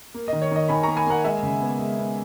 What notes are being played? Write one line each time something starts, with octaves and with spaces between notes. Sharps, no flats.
A#3
D#3 D#5
C#5
D#3 D#5
D#3 G#5 B5
A#3 A#5 C#6
G#5 B5
A#3 F#5 A#5
G#3 E5 G#5
C#3
B3
G#3
B3